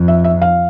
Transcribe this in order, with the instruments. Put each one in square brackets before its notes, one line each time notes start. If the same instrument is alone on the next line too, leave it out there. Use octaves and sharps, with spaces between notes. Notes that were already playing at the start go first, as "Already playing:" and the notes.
Already playing: [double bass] F2
[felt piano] E5
E5
F5